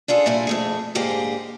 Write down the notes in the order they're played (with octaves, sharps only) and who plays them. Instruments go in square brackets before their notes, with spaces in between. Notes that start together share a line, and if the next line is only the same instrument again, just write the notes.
[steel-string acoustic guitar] D4 F4 G#4 A4
A#2 G3 E4 G#5
F2 A3 G#4
G#2 D3 A#3 G4 G#4 C5